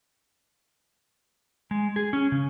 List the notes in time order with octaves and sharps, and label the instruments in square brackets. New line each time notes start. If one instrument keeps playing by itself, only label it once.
[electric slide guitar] G#3
G#4
C#4
C#3